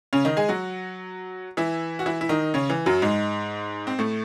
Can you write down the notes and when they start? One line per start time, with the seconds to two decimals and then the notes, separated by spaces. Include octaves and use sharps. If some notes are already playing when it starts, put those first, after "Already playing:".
0.13 C#3 C#4
0.25 D#3 D#4
0.37 G#3 G#4
0.49 F#3 F#4
1.57 E3 E4
1.99 F#4
2.06 E3 E4
2.21 E4
2.29 D#3 D#4
2.54 C#3 C#4
2.70 E3
2.86 F#2 F#3
3.02 G#2 G#3
3.87 C4
3.99 A2 A3